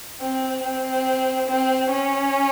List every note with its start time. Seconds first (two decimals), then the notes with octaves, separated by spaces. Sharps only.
0.21 C4
0.63 C4
1.47 C4
1.90 C#4